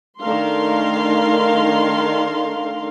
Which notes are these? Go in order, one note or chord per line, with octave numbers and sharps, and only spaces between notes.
D#3 A3 D4 A#4 F5 C6